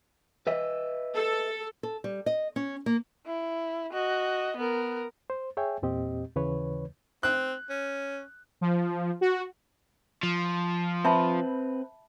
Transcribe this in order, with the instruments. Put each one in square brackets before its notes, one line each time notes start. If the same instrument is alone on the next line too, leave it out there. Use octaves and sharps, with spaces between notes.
[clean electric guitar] B4 D#5 E5
[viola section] A4
[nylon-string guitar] A4
G3
D#5
C#4
A#3
[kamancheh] E4
F#4 D#5
B3 A#4
[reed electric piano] C5
G#4 C#5 E5 G5 G#5
E2 A#2 C4 G4 D#5
D#2 C#3 E3 B4 C#5
[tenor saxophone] C4 [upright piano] F#6
[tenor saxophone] C#4
[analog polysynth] F3
F#4
[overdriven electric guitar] F3
[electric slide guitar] C4 B4 [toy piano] E5 A5 B5